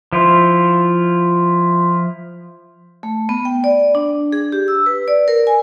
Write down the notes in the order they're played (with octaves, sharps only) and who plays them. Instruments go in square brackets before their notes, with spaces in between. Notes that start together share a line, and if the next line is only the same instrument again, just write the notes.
[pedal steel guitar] F3 E4 F4
[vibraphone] A3
B3
G5
D5
D4
G#4
G4
E6
B4
D5
A#4
G#5